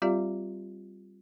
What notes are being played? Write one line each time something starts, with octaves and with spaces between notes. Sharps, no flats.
G3 C4 F4 G4 D5 F5